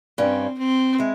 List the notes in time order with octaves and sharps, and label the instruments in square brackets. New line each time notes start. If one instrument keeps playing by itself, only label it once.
[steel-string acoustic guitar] G2 G3 C#4 [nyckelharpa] C4
[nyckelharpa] C4
[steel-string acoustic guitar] G#3 E4